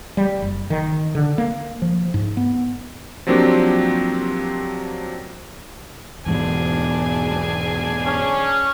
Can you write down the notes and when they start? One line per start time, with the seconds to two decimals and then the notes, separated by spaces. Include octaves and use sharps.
0.17 G3
0.42 F#1
0.70 D#3
1.15 D3
1.38 A#3
1.82 F3
2.14 G#2
2.37 B3
3.27 F3 F#3 A#3 C4 D4 G4
6.26 E2 G#2 B2 D4 G#4 G#5
8.05 C#4